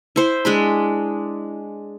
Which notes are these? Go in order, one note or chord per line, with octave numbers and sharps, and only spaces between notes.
E4 C5
G#3 D4 B5